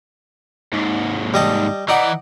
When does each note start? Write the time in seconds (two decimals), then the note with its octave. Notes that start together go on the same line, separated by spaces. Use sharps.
0.73 D#2 G#2
1.34 G3 D#5 A5
1.89 E3 D#4 D5 F#5